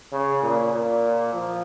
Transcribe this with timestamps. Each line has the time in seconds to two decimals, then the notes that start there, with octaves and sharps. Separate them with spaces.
0.12 C#3
0.43 A#2
0.73 A#2
1.34 F3